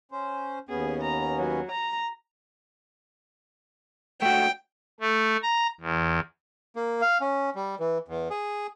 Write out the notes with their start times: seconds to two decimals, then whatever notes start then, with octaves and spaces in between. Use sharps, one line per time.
0.12 C#4 C5
0.69 D#2 B3 C#4 G#4
1.02 A#5
1.38 F#3
1.71 A#5
4.22 A3 F#4 G5
5.00 A3
5.42 A#5
5.81 E2
6.76 A#3
7.02 F5
7.21 C#4
7.55 G3
7.80 E3
8.08 E2
8.30 G#4